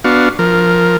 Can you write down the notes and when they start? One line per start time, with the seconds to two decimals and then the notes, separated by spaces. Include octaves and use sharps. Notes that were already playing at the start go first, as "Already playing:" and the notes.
0.04 B3 D4 F#4 F5
0.39 F3 A#4